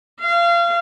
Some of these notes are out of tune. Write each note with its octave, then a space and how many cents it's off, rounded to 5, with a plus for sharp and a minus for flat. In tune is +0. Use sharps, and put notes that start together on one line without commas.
F5 -30